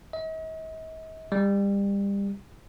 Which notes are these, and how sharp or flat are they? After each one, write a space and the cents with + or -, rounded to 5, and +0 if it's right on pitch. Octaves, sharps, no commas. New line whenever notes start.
D#5 +45
G3 +30